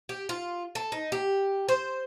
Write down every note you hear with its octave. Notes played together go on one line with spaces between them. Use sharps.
G4
F4
A4
D#4
G4
C5